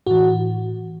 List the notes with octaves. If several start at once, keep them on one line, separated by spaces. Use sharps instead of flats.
A2 E3 F#4